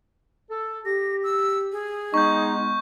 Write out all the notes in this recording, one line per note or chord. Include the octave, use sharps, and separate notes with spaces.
A4
G4 A#6
E6
G#4
G#3 B3 D#4 C#6 G6